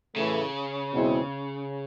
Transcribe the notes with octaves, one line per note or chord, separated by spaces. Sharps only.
A2 C#3 E3 A3
E2 B2 G#3 C4 E4